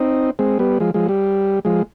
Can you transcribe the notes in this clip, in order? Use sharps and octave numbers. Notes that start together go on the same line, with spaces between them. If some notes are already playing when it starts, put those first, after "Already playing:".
Already playing: C4 D#4
G#3 C4
G3 B3
F3 G#3
F3 G#3
G3
F3 G#3